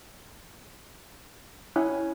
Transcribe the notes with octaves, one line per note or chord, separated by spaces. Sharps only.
C#4 E4